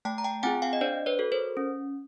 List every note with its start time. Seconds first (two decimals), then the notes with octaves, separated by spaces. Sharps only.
0.05 A3 G5 A5
0.18 A#5
0.24 G5 A5
0.43 C4 F4 G#4 F#5 G#5
0.62 F5 G5
0.73 D#5
0.81 D4 C5 D5
1.06 B4 C#5
1.19 F#4 A4
1.32 A#4 C5
1.57 C#4